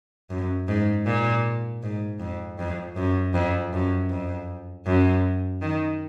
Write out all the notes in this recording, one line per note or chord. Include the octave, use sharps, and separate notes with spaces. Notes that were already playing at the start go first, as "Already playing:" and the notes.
F#2
G#2
A#2
G#2
F2
F2
F#2
F2
F#2
F2
F#2
D#3